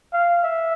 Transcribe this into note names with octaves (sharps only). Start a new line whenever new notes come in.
F5
E5